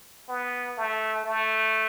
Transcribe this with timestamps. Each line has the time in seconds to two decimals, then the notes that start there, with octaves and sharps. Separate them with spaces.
0.29 B3
0.78 A3
1.24 A3